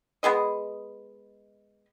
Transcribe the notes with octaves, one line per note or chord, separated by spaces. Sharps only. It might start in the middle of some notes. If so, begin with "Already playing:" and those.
G#3 B3 G#4 D#5